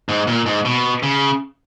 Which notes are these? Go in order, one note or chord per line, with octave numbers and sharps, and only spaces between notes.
G#2
A#2
G#2
B2
C#3